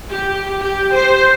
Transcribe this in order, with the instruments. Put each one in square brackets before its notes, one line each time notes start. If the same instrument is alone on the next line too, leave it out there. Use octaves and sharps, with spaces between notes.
[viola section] G4
G4
C5